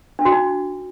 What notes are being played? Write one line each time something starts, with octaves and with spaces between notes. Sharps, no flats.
D4
F#4
D#4